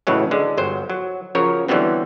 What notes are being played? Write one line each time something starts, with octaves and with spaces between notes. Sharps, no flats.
A2 C#3 E3 F#3 G#3
D3 G#3
G1 F#3 C5
F#3
C#3 F3 F#3 A#4 C#5
D3 E3 F#3 G3 B3 C4